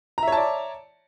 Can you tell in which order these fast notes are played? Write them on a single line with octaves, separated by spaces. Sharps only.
A#5 E5 C#5 A5 D5